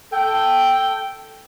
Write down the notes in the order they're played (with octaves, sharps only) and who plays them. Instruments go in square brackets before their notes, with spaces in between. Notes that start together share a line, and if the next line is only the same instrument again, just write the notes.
[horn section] A4 G5